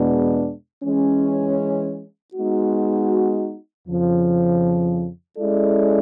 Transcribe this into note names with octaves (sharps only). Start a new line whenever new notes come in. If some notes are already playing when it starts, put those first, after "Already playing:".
Already playing: E2 B2 G#3 B3 D4
E3 G#3 C#4
G#3 B3 D#4 F#4
F2 C#3 F3
G#3 C#4 E4 A4 D5